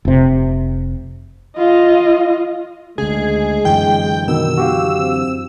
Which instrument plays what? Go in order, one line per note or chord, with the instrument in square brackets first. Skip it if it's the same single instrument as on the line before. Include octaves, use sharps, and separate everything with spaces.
[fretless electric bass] F1 C3
[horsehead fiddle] F4 D#5
[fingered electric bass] D2 C#3 [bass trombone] G#3 [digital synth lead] G#4
[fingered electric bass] F#2 D3 E3 [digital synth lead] G5
[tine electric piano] B2 D#3 [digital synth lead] E6
[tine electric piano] F#4 G4 F5
[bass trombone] C4